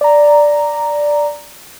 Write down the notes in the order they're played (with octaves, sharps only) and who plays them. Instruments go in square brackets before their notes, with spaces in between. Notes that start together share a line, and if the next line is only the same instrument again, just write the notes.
[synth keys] D5 A#5